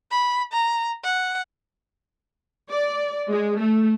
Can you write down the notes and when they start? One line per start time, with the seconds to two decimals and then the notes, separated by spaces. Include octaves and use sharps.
0.11 B5
0.53 A#5
1.04 F#5
2.69 D5
3.29 G#3
3.58 A3